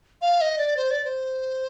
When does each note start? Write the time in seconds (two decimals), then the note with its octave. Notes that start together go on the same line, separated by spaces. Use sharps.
0.22 F5
0.41 D#5
0.58 D5
0.77 C5
0.91 D5
1.05 C5